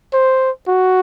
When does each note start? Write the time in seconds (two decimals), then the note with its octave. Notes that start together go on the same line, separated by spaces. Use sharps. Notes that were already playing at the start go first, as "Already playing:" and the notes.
0.13 C5
0.67 F#4